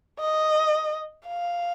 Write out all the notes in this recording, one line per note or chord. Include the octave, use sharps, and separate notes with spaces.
D#5
F5